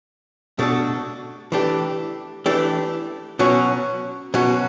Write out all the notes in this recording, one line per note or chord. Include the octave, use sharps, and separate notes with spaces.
B2 A3 D4 F#4 A4
E3 A3 D4 G4
E3 A3 D4 G4
B2 F#3 C#4 F#4
B2 F#3 C#4 F#4